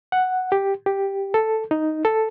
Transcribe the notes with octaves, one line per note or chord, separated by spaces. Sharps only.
F#5
G4
G4
A4
D#4
A4